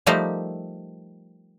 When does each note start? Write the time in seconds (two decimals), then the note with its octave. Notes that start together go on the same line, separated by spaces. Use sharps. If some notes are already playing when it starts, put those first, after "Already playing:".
0.06 F3 G3 A3 D#4 G4 A#4